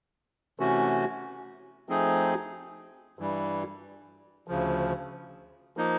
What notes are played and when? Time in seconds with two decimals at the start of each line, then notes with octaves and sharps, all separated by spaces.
0.59 C3 E3 A3 C#4 F#4
1.89 F3 A3 C4 D#4 G#4
3.19 G2 E3 G3
4.48 D2 C#3 F3
5.77 F3 A#3 D#4